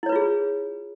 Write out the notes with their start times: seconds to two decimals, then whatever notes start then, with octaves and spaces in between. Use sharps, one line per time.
0.03 E4
0.06 C#5
0.09 B4
0.12 F4
0.16 G#4